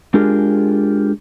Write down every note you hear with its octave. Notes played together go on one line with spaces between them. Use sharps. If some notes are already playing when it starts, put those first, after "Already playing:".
G#3 D4 F4 G4 G#4 A#4